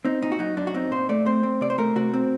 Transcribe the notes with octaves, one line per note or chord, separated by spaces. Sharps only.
C4 D#4
A#2 D#4
F#4
F#3 D#4
F#2 D4
F#4
C4 D#4
A#2 C5
A3 D5
C4 C5
C4
C3 D5
C5
A3 A#4
C3 F#4
C4